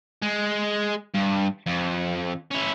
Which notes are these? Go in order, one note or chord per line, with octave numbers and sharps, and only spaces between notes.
G#3
G2
F2
C#4 E4